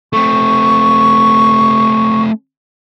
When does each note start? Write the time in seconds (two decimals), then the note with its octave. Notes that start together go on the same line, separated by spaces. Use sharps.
0.13 A3 C4 C#6